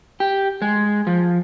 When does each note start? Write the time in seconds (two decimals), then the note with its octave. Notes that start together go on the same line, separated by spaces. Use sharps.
0.20 G4
0.62 G#3
1.07 F3